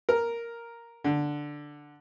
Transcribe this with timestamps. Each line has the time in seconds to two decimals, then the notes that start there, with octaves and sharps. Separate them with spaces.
0.09 A#4
1.04 D3